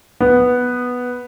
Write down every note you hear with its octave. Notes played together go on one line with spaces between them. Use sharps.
B3